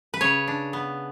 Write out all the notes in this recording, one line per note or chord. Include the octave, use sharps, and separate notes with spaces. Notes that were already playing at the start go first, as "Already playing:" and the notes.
B4
C#3 C#5
D4
B3